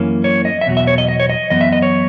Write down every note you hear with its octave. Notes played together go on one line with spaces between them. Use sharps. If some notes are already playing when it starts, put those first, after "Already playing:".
Already playing: F#2 E3 A#3 C#4
C#5
D#5
E5
E2 B2 F#3
E5
C#5
D#5
D#5
C#5
D#5
F#2 E3 B3 D#5
E5
D#5
C#5